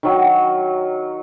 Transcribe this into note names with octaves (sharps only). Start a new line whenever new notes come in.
D#3 F#3